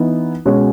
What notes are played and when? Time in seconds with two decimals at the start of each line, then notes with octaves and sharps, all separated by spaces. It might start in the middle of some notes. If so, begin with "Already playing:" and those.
Already playing: E3 B3 D#4
0.45 B2 G#3 C#4 F#4 C#5